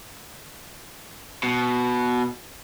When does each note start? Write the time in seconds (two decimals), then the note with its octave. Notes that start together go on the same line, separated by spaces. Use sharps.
1.43 B2